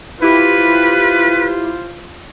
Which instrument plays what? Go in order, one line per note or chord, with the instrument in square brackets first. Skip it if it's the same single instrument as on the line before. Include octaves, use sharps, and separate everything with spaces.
[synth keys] E4 G4 [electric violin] F4 C5 [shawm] B4